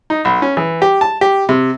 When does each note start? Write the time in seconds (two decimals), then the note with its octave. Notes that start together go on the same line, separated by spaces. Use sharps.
0.10 D#4
0.25 B1
0.42 C#4
0.57 E3
0.82 G4
1.01 A5
1.21 G4
1.49 C3